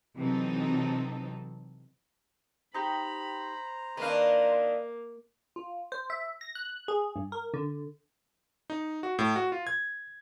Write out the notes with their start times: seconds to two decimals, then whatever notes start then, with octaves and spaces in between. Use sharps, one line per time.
0.17 C3 E3 F#3 C4 D#4 A4
2.74 D#4 G4 C5 A#5 B5
3.97 D#3 A#3 D4 B4 F5
5.56 F4
5.92 C5
6.10 E5
6.41 A#6
6.55 F#6
6.88 G#4
7.16 G2
7.32 A#4
7.54 D3
8.70 D#4
9.03 F#4
9.19 A2
9.36 F#4
9.52 F4
9.67 G#6